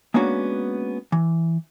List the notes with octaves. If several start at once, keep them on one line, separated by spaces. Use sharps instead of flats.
G#3 A#3 B3 C#4 D4 F#4
E3